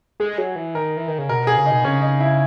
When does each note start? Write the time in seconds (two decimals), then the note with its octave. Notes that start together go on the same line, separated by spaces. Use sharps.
0.20 G#3 G#4
0.38 F#3
0.56 E3
0.74 D#3 A#4
0.97 E3
1.08 D#3
1.18 C#3
1.29 B2 A#4
1.43 B2 G#4
1.57 C#3
1.66 B2 D#4
1.79 B2
1.84 C#3 C#4
2.02 D#4
2.20 E4